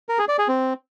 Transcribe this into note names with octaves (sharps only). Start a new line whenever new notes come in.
A#4
G#4
D5
G#4
C4